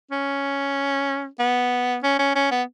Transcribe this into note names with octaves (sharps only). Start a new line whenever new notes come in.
C#4
B3
C#4
C#4
C#4
B3